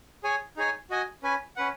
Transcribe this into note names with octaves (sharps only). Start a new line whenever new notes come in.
G#4 C#5 G#5
D#4 G#4 C#5 G#5
F#4 D#5 G#5
C#4 B4 G#5
C#4 B4 F#5